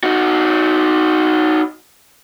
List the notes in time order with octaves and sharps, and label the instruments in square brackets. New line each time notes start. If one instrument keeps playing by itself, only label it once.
[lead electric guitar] D#4 F#4